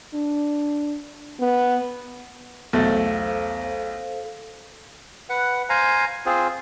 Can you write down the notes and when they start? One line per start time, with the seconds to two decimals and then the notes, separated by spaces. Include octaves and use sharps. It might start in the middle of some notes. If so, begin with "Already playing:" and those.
0.15 D4
1.40 B3
2.73 B1 E2 A3 A4 C5 F5 A6
5.30 B4 F#5
5.69 C5 F5 G#5 A#5
6.26 C4 F4 G#4 C5